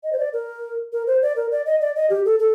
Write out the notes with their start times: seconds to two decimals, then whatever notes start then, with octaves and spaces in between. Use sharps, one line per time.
0.04 D#5
0.12 C5
0.19 D5
0.33 A#4
0.93 A#4
1.07 C5
1.22 D5
1.36 A#4
1.51 D5
1.66 D#5
1.81 D5
1.96 D#5
2.10 G4
2.25 A4
2.39 A4